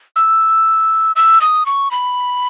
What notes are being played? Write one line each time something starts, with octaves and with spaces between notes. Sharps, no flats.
E6
E6
D#6
C#6
B5